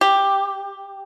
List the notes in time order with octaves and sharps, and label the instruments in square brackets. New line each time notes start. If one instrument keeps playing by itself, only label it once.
[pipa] G4